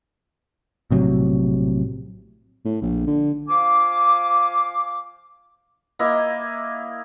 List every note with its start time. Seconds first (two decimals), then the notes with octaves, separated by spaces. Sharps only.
0.91 A#1 A2 C3 F#3
2.65 A2
2.82 A#1
3.07 D3
3.48 F3 F5 G#5 D6
5.99 A#3 E4 D#5